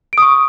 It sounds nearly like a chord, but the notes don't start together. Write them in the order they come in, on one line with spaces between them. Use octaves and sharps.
D7 D#6 C#6